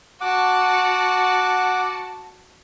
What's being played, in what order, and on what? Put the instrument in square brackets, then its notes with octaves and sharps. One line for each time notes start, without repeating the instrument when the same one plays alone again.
[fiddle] F#4 A5 [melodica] F#5 D6